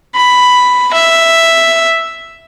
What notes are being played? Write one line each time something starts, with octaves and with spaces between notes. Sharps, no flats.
B5
E5